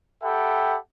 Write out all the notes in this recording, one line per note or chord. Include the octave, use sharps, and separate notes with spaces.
G4 A4 E5 F#5 G5 B5